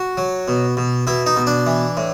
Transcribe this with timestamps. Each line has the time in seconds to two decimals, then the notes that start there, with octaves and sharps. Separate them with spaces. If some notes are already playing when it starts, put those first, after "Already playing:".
Already playing: F#4
0.17 F#3
0.48 B2
0.77 B2
1.07 B2 E4
1.26 D#4
1.36 B2
1.47 D4
1.66 E3
1.97 A2